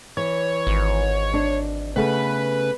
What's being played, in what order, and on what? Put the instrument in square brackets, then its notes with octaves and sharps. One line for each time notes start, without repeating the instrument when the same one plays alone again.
[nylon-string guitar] E3 [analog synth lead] C#5
[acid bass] G#1
[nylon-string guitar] D4
[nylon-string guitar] C#3 A3 B3 [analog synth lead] B4